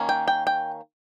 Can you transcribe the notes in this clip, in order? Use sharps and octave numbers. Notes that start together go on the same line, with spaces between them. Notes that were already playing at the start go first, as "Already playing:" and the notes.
Already playing: D#3 A#3 C#4
G5
G5
G5